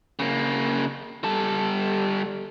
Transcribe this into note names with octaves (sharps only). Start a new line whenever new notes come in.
C#3 A#3
G3 A4